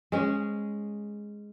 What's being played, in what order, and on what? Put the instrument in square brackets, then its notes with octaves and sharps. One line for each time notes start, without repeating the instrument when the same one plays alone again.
[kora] G#3 C#4 G#4